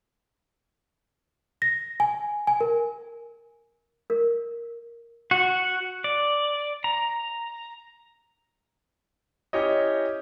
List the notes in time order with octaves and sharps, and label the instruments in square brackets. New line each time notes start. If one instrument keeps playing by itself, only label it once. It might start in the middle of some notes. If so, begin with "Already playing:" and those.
[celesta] A#6
G#5
G#5
A#4
[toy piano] A#4
[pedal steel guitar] F#4
D5
A#5
[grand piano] C#4 E4 G4 C#5 D#5